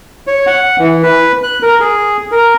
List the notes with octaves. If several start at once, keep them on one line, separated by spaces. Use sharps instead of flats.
C#5
F#5
E3
B4
F#6
A#4
G#4
A#4